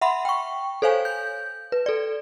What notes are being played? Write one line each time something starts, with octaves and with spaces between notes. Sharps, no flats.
E5 F#5 B5 C6
G5 C#6
A4 C5 C#5 F5 G#5
G6
B4
A4 D5